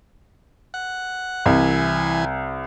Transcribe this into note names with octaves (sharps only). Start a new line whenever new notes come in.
F#5
C2 E3 G#5